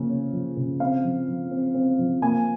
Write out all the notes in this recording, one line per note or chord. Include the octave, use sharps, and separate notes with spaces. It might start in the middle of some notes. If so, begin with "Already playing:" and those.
Already playing: C#3 F3 A#3
C#4
F3
C#3
C4 F5
F3
F3
C4
C4
F3
A#3 G#5